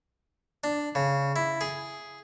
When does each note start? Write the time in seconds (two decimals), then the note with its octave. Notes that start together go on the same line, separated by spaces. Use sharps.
0.64 D4
0.95 C#3
1.36 E4
1.61 G#4